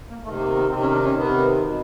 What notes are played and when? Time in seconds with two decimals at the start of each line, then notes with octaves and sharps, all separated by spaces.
0.09 A#3
0.24 C3 D#3 A3
0.39 A#3
0.54 B3
0.69 C3 D#3 C4
0.81 C#4
0.92 D4
1.04 C#4
1.14 C3 D#3 B3
1.61 B2